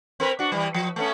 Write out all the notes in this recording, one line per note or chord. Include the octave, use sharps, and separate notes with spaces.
C4 A#4 B4
D4 F#4
E3 G3
F3
A3 B3 C#4